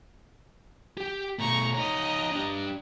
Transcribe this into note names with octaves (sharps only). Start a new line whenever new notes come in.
G4 G5
B2 A3 A#5 C#6
D#4 C#5 D#5 A#5
D4 G4